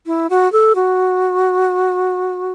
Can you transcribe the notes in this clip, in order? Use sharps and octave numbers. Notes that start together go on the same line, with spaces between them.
E4
F#4
A4
F#4